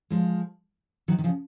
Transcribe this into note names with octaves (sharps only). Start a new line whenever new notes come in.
F3 G#3
D#3 F#3
D#3
C#3 F3